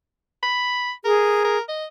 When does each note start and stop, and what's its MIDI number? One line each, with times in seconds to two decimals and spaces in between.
0.43 0.92 83
1.05 1.57 68
1.05 1.41 70
1.44 1.61 70
1.68 1.85 75